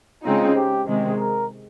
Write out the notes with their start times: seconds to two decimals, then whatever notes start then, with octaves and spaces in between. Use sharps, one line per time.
0.24 C#3 G#3 C4 D#4 F4
0.55 G4
0.87 C3 D#3 G#3
1.17 A#4